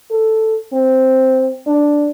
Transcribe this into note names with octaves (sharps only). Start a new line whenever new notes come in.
A4
C4
D4